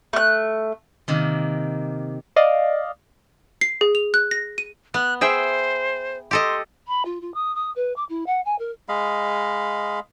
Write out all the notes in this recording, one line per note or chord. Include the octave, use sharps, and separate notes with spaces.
A3 F#6
C3 D#3 A#3
D5 D#5 F5
C7
G#4
F7
F#6
A#6
D#7
B3 F#6
G#4 C5 E5 G5
G4 A4 D#5 C6
B5
F4
F4
D#6
D#6
B4
D6
E4
F#5
G#5
A#4
G#3 D#5 F5 B5